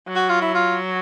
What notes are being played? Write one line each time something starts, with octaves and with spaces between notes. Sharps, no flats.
F#3
F#4
F4
E4
F4